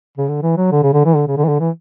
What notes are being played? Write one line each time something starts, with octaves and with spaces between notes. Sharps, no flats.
C#3
D3
E3
F#3
D3
C#3
D3
E3
D3
C#3
D3
E3
D3
E3